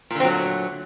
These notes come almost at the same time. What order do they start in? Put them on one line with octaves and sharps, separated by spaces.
A#2 D3 C4 F#3 A3